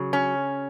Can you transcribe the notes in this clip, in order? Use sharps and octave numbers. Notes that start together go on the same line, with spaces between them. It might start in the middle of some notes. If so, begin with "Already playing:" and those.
Already playing: C#3 F#3
C#4